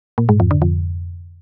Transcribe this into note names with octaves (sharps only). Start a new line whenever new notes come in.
A#2
G#2
F2
D3
F2